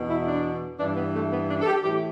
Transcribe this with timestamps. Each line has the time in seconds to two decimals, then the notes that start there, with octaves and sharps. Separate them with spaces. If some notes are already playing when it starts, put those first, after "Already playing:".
Already playing: E2 B2
0.10 E4
0.27 D4
0.79 G2 E3 D4
0.97 B3
1.15 A3
1.32 B3
1.50 D4
1.61 A4
1.67 G4
1.84 A2 E3 G4